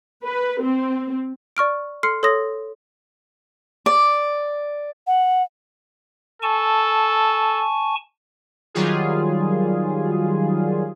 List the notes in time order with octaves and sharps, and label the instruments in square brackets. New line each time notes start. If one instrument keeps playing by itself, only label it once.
[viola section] B4
C4
[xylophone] D5 C#6 F6 D7
A4 C6 F6 C7 C#7
A4 C#5 C6 D#6 A#6
[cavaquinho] D5
[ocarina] F#5
[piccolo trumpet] A4 [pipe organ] G#5 A5 C#6
[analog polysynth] D#3 F#3 G3 F4 G#4